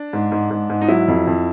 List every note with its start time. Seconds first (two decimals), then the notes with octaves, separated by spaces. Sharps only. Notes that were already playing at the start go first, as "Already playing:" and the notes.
Already playing: D4
0.13 G#2
0.32 G#2
0.51 G#2
0.70 G#2
0.81 D#4
0.88 F#3 E4
1.08 F2
1.27 F2